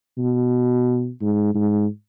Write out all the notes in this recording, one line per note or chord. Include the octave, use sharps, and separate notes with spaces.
B2
G#2
G#2